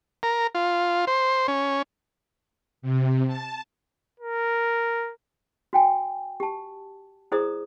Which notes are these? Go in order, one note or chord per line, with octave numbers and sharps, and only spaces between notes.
A#4
F4
C5
C#4
C3
A5
A#4
F#4 G5 G#5
G4 A5
E4 G#4 C5 D5 A#5 D#6